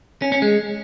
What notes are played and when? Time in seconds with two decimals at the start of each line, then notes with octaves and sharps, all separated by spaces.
0.22 C#4
0.32 C#4
0.42 G#3